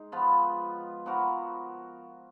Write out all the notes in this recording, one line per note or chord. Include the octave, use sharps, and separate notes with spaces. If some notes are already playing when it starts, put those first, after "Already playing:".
Already playing: G#3 D#4
F3 B3 F4 B4
F3 B3 F#4 A#4